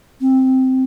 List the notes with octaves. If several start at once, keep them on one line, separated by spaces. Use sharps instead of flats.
C4